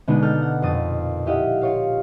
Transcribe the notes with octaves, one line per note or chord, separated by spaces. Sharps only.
B2 D3 G#3 B3 D4 D#4
A4 F6 G6
F#5
F2 A#2 D#6 A6
E4 G4 D#5 F5 F#5
F4 C#5 F5